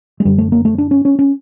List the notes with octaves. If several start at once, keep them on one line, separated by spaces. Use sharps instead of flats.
G#3
F#2 D3 G3
A3
A#3
A3
D4
C#4
C#4
C#4